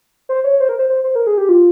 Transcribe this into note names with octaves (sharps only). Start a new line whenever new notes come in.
C5
C#5
C5
A#4
C5
C5
C5
A#4
G#4
G4
F4